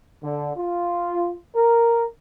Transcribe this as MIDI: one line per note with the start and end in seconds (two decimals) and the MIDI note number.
0.23 0.50 50
0.57 1.35 65
1.55 2.04 70